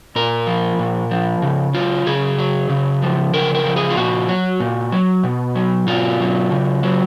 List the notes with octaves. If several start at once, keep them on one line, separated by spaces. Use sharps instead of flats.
A#2 A#4
F3
A#2
F3
C#3
F#3 F4
C#3 G#4
F#3
C#3
F3
C#3 A#4
A#4
F3
G#4
F4
A#2 F#4
F#3
A#2
F#3
B2
F#3
B2 F4
F#3
C#3
F#3